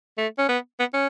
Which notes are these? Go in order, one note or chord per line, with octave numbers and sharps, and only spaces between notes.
A3
C#4
B3
B3
C#4